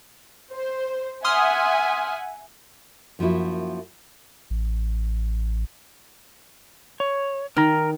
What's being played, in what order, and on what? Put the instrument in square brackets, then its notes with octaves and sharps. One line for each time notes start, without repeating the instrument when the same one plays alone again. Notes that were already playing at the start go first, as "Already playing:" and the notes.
[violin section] C5
[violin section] E5 F#5 G#5 [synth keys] C6 D#6 F6
[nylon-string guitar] F#2 F3 A#3 E4 F#4
[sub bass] A1
[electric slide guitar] C#5
[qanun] D#3 [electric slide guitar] A#4 A#5